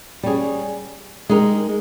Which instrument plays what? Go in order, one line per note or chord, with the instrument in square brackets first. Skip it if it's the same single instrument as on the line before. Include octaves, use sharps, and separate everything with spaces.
[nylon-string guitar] G3 C#4 G#4
G#3 D#4 G4 A#4